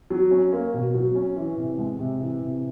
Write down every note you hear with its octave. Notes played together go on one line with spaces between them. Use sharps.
F#3
C#4
A#3
B2
F#3
C#4
E3
C3
G#3
C3
E3
C3